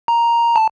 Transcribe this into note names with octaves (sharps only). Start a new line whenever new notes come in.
A#5
A5